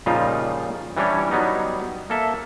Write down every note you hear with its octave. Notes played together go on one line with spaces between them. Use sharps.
A#2 C#3 F3 G3 D#4 F4
E3 G3 C#4 D4 C#5
F#3 G3 B3 D#4
A#3 A4 E5